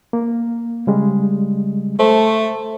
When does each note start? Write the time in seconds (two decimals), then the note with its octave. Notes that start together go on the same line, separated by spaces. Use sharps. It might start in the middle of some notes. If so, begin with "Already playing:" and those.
0.13 A#3
0.87 C#3 G3 G#3
2.00 A3 C5